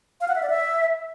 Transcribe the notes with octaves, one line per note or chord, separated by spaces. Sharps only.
F5
F#5
E5
D5
E5